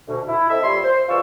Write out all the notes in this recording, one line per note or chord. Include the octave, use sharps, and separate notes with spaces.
D2 B2
E4
C4 A4 D#5 E5
A#2 G3 C#5 E5 C6
C5
C#2 E3 F4 D5 C#6 E6